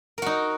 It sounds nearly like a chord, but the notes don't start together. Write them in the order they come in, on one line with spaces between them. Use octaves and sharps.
A#4 F#4 D#4